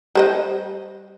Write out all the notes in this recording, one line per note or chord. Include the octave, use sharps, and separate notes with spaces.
G3 C5 D#5